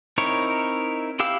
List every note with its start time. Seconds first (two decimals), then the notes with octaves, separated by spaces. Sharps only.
0.18 C4 D#4 E4 A#4 C#5
1.20 E4 G4 F5 E6